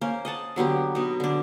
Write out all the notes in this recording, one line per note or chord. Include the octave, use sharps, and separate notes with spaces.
A#3 C#4 C5
D#5 F#5 A5
D3 F#3 B3 G4
B2 D#4
D3 D4